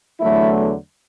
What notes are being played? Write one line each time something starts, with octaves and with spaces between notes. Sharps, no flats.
E2 D3 F#3 A3 E4